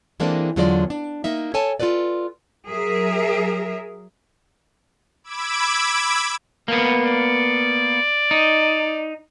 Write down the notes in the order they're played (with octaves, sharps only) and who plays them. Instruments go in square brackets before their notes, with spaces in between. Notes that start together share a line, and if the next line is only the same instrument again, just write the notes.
[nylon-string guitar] E3 G#3 A#3 C4 D4 A4
E2 D3 F#3 G#3 F4 D5
D4
A#3 D#4 E5
A4 C#5 G#5 A5
F4 F#4 A4 B4 D5
[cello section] F#3 G#4 A#4 E5
[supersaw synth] B5 D6 E6 G#6 D7
[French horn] B2 [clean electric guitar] A#3 B3
[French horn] D5
[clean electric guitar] D#4